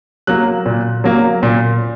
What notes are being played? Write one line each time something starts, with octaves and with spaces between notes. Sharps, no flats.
F#3 A#3 F#6
A#2
F#3 A#3
A#2